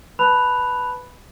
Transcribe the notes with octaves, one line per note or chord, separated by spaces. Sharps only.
B4 A5 B5 F#6 F7